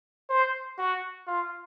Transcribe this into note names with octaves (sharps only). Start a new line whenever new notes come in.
C5
F#4
F4